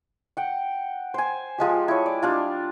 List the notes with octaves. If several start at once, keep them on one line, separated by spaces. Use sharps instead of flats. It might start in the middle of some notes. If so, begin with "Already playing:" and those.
F#5 G5
C5 G#5
F3 G#3 G4
E4 C#5
D5
G3 D4 F4